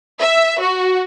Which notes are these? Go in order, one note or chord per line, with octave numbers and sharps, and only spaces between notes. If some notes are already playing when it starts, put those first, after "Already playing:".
E5
F#4